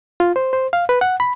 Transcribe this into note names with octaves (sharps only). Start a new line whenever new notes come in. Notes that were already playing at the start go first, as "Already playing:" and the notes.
F4
C5
C5
F5
B4
F#5
B5